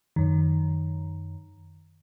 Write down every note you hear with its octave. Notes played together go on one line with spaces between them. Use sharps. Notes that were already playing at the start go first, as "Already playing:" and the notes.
F#2 D#3